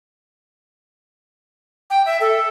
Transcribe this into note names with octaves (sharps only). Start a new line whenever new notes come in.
G5
E5
A4